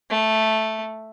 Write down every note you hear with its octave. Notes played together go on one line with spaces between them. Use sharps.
A3